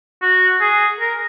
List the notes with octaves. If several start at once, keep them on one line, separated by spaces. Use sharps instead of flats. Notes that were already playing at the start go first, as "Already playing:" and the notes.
F#4
G#4
A#4